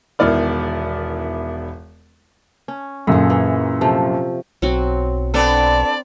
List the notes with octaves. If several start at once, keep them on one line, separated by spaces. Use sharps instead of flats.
E1 D#3 B3 E4 D5 F6
C#4
F#2 A#2 D3 G#4
E3
C3 F3 A3
B1 F#3 C4 F#4
B3 C4 D4 A4 D5 G#5 A#5